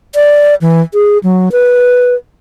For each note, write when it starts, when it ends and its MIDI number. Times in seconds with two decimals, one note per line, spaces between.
0.15 0.55 74
0.62 0.81 52
0.94 1.18 68
1.23 1.49 54
1.52 2.15 71